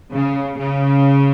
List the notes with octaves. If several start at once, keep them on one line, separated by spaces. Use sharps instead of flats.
C#3
C#3